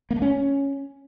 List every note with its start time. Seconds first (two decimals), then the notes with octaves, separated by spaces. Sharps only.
0.11 A#3
0.16 A3
0.22 C#4